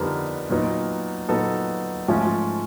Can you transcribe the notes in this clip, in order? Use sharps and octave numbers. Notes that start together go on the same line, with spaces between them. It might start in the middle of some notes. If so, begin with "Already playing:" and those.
Already playing: F2 D3 G3 B3 D#4 A#4
A#2 F#3 B3 D#4
A#2 F#3 B3 D#4 A4
G#2 F3 A3 C#4